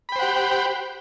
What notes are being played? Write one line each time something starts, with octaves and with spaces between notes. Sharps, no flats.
G4 C5 F#5 G5 B5